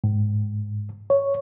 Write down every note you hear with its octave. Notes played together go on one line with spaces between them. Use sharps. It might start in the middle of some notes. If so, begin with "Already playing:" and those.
G#2
C#5